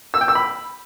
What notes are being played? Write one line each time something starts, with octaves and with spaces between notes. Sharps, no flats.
E6
G5
E6
B5